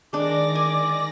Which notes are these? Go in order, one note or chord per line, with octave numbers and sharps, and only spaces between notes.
D#3 G#3 D4 D5 D6 A#6
G#5